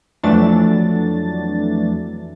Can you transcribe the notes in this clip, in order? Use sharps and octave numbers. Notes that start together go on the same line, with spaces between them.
F2 E3 F#3 A3 D4 A6